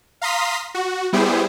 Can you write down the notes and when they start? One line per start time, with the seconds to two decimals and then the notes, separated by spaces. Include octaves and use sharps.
0.21 F5 A#5 C6 D#6 B6
0.74 F#4
1.13 G3 B3 E4 G4 G#4 C5